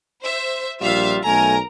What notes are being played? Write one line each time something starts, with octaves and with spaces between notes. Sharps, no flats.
C5 E5
A#1 G3 F4 E5 F5
B1 A3 A#4 G#5 A#5